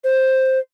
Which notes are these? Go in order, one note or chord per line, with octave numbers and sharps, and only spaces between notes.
C5